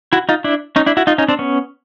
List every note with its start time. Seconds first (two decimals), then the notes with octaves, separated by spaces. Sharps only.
0.13 E4 F#4
0.29 D#4 F4
0.44 D4 E4
0.76 C#4 D#4
0.86 D4 E4
0.97 E4 F#4
1.07 D#4 F4
1.18 C#4 D#4
1.28 C4 D4
1.39 B3 C#4